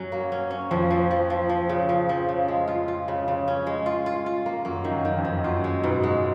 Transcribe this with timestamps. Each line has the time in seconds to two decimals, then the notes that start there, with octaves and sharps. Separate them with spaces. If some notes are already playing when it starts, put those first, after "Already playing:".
Already playing: F#2 F#3 C#4
0.12 A#3
0.32 C#4
0.51 C#4
0.71 F2 F3
0.90 F3
1.11 F3
1.30 F3
1.49 F3
1.69 C#3
1.89 F3
2.09 F3
2.29 C#3
2.48 G#3
2.68 F4
2.88 F4
3.08 C#3
3.28 C#3
3.48 C#4
3.67 G#3
3.86 F4
4.06 F4
4.26 F4
4.46 A#3
4.65 F#2 A#3
4.85 D#3
4.91 F#2
5.05 D#3
5.18 F2
5.25 D#3
5.44 F#2 F4
5.64 G#3
5.84 G#2 B2
6.03 G#3